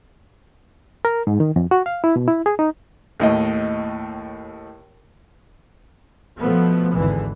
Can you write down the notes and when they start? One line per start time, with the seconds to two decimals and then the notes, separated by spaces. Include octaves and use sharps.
1.05 A#4
1.27 G#2
1.40 D#3
1.56 F2
1.71 F#4
1.86 F5
2.04 E4
2.16 B2
2.28 E4
2.46 G#4
2.59 D#4
3.20 D#2 A2 D#5
6.38 B2 F3 A3 B3
6.94 G#1 E2 D3 E3